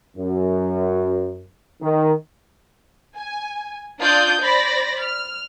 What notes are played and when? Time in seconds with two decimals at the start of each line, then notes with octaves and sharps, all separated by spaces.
0.16 F#2
1.81 D#3
3.18 G#5
4.00 D4 F4 D5 D#6 G6
4.41 C5 D5 B5 A#6
5.01 F6